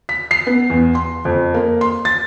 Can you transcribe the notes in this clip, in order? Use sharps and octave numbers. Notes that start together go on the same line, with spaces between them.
B6
C7
B3
E2
C6
F2
A#3
C6
A6